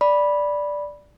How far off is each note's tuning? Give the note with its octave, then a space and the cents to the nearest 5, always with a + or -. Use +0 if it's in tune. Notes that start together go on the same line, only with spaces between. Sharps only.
D5 +0 B5 -10